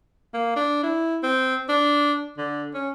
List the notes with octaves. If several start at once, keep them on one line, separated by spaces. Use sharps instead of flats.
A#3
D4
E4
C4
D4
D3
C#4